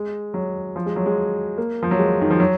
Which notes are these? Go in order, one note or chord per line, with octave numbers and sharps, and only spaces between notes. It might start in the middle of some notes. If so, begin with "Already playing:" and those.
Already playing: G#3
F#3
F3
G#3
F#3
G#3
A#3
F3
F#3
G#3
D#3
F3
F#3